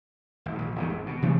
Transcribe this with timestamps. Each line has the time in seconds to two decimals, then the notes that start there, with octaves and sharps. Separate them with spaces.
0.46 G#1
0.59 A#1
0.76 G1 E2 D3 D#3
0.90 G#1
1.07 B2
1.22 C3 E3 G3 A3